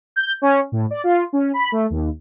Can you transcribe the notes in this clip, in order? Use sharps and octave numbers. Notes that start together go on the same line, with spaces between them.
G6
C#4
A2
D5
F4
C#4
B5
A3
D#2